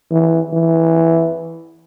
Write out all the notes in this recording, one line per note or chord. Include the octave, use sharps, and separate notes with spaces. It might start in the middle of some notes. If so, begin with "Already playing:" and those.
E3
E3